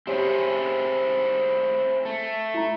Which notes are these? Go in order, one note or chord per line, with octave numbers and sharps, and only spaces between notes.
C4 E4 G4 G#4 C5 C#5
A3
E4 A#5